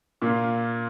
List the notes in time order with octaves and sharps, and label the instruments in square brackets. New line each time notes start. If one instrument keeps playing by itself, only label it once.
[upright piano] A#2 A#3 F4